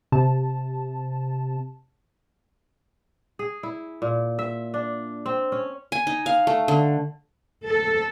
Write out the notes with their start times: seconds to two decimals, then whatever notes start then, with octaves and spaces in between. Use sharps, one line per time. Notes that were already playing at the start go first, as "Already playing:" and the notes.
0.12 C3 A5
3.39 G#4
3.63 E4
4.02 A#2
4.39 E5
4.74 D4
5.26 C4
5.52 C#4
5.92 G#5
6.07 D#4
6.26 F5
6.47 A3
6.68 D3
7.65 A4